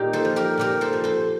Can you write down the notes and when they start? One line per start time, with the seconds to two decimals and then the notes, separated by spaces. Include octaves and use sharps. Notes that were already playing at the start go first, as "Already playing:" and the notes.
Already playing: A#2 D#4 G4
0.13 A4 C5
0.25 F3
0.36 G4 A#4
0.57 A#2 G4 A#4
0.81 A4 C5
0.93 F3
1.04 A4 C5